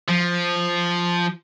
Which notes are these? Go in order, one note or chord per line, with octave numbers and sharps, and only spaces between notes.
F3